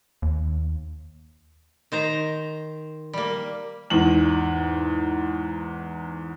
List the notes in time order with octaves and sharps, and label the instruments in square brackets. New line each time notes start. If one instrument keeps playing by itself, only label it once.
[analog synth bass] D#2
[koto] D#3 C5 A#5
G3 A#3
[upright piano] E2 G#2 F#7